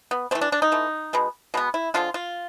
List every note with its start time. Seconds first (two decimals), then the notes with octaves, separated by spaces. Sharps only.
0.11 B3
0.31 E3 A3 C4
0.41 D4
0.52 D4
0.62 D#4
0.72 E3 A3
1.13 B2 G#3 B3
1.54 B2 G#3 B3
1.74 E4
1.94 D3 F3 G#3 F4
2.14 F4